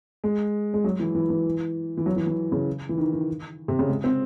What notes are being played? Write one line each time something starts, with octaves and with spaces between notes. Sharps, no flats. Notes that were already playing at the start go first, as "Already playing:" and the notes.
G#3
G#3
F#3
E3
E3
E3
E3
F#3
E3
E3
C#3
E3
D#3
D#3
C3
C#3
G#3
C4